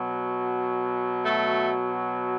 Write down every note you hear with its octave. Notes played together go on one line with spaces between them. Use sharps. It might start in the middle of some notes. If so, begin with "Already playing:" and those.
Already playing: B2 F#3
A3